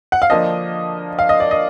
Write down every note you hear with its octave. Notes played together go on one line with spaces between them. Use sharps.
F#5
F5
D3 F3 A#3 D4 D#5
F5
D#5
D5
D#5